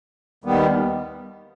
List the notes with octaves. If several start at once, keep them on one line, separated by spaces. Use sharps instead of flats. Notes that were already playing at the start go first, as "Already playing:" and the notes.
D#2 D#3 G3 B3